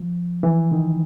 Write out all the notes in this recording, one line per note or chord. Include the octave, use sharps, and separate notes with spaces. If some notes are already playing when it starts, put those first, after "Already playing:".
Already playing: F3
E3
D#3